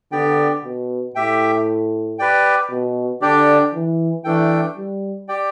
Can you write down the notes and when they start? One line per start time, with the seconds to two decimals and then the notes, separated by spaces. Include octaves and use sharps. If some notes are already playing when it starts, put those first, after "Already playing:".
0.12 D3 B3 G4 D5 G5
0.64 B2
1.15 A2 G4 E5 G5
2.19 G4 B4 D5 G5
2.71 B2
3.22 D3 D4 G4 D5 G5
3.74 E3
4.24 E3 A3 D4 A4 G5
4.77 G3
5.29 G4 D5 G5